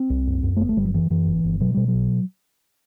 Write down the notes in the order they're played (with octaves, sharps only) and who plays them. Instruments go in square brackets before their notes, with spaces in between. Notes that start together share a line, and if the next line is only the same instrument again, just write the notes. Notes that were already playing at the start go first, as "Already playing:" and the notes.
Already playing: [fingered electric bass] C4
C2
F#2
F#2
A3
G1 B3
A3
G1 G3
F#3
F#2 E3
F#2 E3
G1
G1
B2 F#3
B2 G3
F#3
B1